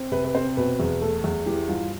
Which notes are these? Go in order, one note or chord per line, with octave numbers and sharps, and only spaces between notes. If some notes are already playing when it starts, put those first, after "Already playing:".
Already playing: C4
C3 B4
B4
C4 C5
B2 B4
E2
A3 A4
E2
E3 G4
G2 F4